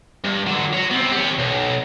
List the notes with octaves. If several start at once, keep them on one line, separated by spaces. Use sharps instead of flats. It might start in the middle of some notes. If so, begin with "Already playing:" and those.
G2
D3 F#3
F#4 C#5
B3 C4
G4 C#5
B1